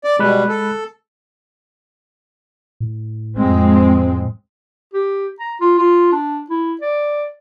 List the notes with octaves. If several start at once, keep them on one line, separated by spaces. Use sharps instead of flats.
D5
B2 G3 G#3 B5 F#6
A4
A2
F2 G#3 C4
G4
A#5
F4
F4
D4
E4
D5